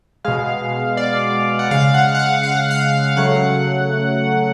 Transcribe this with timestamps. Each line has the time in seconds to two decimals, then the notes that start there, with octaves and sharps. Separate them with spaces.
0.25 B2 G#3 F5
0.97 D5
1.59 F#5
1.71 C#3 G#3 F5
1.94 F#5
2.15 F#5
2.19 F5
2.43 F5
2.57 F#5
2.71 F5
3.17 C#3 F#3 A3 F#5